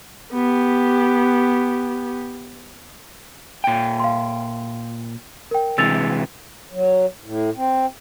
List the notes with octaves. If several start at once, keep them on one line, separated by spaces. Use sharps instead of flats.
B3 G4
A#2 G5
F5 C6
A#4 G5
C3 E3 G#3 E6 A6 F7
F#3
A2
C4